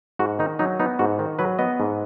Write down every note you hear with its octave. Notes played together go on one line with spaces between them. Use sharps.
G#2 F#4
D#3 D#4
F#3 D#4
B3 D#4
G#2 F#4
D#3
F#3 B4
B3 D#5
G#2